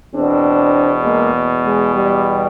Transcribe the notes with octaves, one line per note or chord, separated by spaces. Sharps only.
E2 B2 C4 D4
G#3 A#3
G#3
G3